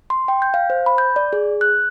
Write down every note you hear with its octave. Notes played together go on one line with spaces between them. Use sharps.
C6
G5
G6
F5
C5
B5
G6
D5
G#4
F#6